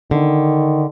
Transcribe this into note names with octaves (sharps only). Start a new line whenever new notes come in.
D3 D#3